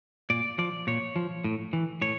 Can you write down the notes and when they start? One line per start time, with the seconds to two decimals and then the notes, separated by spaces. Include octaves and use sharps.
0.30 A#2 D5
0.58 F3 D5
0.87 A#2 C#5
1.16 F3
1.44 A2
1.73 E3
2.02 A2 C#5